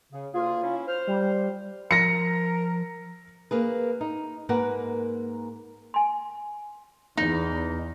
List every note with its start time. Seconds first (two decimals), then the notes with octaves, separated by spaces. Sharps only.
0.12 C#3
0.34 D2 A#3 F4 G#4
0.63 C#4 E4
0.87 C5 F6
1.07 G3
1.91 F3 A#4 A#6 C#7
3.51 A#3 G#4 B4
4.01 D#4
4.49 G#2 A#3 A#4 B4 F#5
5.94 G#5 C6
7.17 E2 D#4